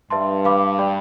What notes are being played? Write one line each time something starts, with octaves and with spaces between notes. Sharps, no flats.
G2 B4 E5 A5 C6
B4 F5 B5 D6
G4 D5 G5 B5